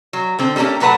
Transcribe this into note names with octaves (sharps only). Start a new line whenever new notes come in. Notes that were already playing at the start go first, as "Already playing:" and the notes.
F#3
D3 C4
G3 A3 A#3 C#4 G4
A#2 F#3 A3 B4 F#5 A5